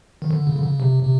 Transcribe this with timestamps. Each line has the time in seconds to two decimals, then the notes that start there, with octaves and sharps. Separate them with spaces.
0.22 D#3
0.31 D3
0.47 C#3
0.56 D3
0.63 C#3
0.80 C3
1.04 C3